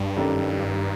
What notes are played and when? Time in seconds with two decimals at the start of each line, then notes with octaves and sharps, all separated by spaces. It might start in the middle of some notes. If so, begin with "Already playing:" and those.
Already playing: G2
0.16 F#2 D#3 G3 D4 A4